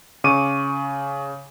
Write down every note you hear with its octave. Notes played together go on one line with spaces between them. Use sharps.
C#3 C#6 D6 D#7